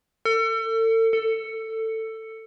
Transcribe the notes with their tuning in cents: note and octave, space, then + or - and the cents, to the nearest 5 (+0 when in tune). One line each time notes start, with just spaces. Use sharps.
A4 +35
A4 +15